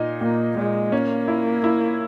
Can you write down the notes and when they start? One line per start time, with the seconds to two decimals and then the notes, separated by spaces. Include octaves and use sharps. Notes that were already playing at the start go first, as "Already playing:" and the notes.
Already playing: A#2 D#4
0.21 A#2 A#3
0.57 A#2 G#3
0.92 A#3 C#4
1.28 E4
1.64 E4